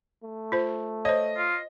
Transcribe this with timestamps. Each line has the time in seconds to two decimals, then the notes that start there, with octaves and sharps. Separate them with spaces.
0.23 A3
0.52 F4 C5
1.05 C5 C#5 D#5
1.37 F4